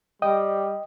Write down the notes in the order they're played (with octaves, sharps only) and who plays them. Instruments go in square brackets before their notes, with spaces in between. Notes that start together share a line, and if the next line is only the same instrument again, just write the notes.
[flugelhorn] G3 [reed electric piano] D#5 G5 D#6